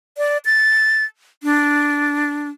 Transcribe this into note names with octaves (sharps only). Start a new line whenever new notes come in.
D5
A6
D4